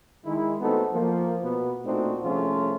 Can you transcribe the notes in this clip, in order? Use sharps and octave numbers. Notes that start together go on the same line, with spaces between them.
D#3 G#3 E4
A3 B3 C4 D#4 F#4 A4
F3 A#3
B2 B3
A#2 A3 C4 D4 D#4 F#4
C2 F3 A3 C#4 F4 G#4